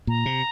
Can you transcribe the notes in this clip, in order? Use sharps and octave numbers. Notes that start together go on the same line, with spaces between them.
A#2 A#5
C3